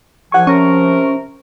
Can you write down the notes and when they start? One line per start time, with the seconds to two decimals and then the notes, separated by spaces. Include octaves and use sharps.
0.32 C2 F3 F#5 G#5 C#6
0.47 C3 C#4 A#4 C#6